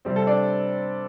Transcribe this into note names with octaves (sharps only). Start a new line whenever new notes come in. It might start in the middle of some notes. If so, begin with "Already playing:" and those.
C3 G3 C4
A4
D4 D5